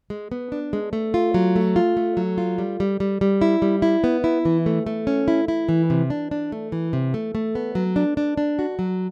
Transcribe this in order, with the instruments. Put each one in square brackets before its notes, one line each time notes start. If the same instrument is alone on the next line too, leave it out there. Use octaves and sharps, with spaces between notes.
[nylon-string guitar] G#3
B3
D4
G#3
A3
F4
F#3
A3
F4
A3
F#3
F4
G3
G3
G3
G3
E4
G3
E4
B3
E4
E3
A3
A3
C#4
E4
E4
E3
C3
D4
D4
A3
E3
C3
A3
A3
B3
F#3
D4
D4
D4
F#4
F#3